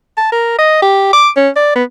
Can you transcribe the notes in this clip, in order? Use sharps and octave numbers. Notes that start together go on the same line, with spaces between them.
A5
A#4
D#5
G4
D6
C#4
D5
B3